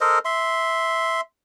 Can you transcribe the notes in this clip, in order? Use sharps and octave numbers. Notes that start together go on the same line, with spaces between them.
A4 A#4 C5 D#5
E5 C6